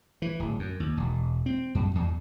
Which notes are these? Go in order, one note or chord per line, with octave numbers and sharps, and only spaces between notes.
E3
D1
F#2
D#2
E1
C4
F#2
E2